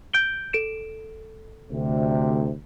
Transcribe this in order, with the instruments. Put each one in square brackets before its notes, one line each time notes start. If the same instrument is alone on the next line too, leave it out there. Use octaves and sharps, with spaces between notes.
[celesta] G6 D7 G7
A4 D7 E7
[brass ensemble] D2 C3